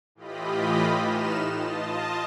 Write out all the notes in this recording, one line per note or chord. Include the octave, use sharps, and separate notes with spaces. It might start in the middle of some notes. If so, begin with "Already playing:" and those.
A2 E3 F4 G4 D#5 B5
A2 D#4 B4 F6 E7
F4 D#5 A5